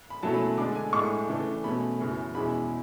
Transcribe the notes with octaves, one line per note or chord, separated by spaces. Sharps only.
B5
B2 F#3 A3 C#4 E4 A5
B5
B5
D3 G#3 D4 D6
G#5
A2 G#3 D4 C#6
C#3 E3 A3 D4
B2 A3 C#4 B5
F#2 C#3 E3
E2 B2 G#3 C#4 E4 B5